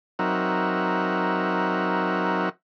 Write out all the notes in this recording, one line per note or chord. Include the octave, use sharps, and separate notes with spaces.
F#3 C4 D#4 A#4 E5 F#5